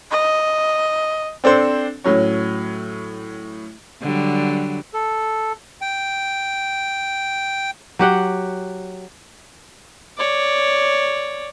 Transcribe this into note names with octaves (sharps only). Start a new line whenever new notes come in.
D#5
C4 D4 A4 C5
A2 F#3 C#4
D3 F#3 G3
A4
G5
F#3 G4 F#5 G5
C#5 D5